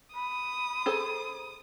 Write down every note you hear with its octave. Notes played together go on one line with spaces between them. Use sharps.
B5 D#6
G#4 A4 C5